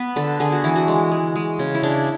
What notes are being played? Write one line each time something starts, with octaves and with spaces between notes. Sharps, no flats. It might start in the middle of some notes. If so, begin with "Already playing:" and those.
Already playing: B3 B4
D3 A4
D3 G#4
F#4
E3 E4
F#4
G#3
G#3
G#3
C#3
E4
C#3 D4